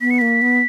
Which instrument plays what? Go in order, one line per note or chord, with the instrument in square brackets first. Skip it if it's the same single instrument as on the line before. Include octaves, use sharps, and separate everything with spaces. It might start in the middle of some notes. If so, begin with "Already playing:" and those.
[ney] B3 [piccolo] B6
[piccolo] C#7
[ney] A#3 [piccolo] B6
[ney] B3